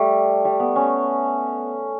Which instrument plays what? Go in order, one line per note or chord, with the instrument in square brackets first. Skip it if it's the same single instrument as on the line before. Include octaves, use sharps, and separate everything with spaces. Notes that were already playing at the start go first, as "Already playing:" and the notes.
Already playing: [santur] G3 A3
G3
B3
C#4